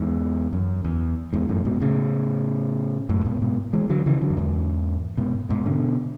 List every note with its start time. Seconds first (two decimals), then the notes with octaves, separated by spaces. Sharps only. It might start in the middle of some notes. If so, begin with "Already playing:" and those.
Already playing: E2 G#2
0.53 F#2
0.84 E2
1.33 E2 G#2
1.49 F#2 A2
1.65 G#2 B2
1.80 A2 C#3
3.09 F#2 A2
3.25 G#2 B2
3.41 G#2 B2
3.73 E3 G#3
3.89 D3 F#3
4.06 C#3 E3
4.21 D3 F#3
4.30 F#2
4.37 E2 G#2
5.18 G#2 B2
5.49 G#2 B2
5.66 B2 D3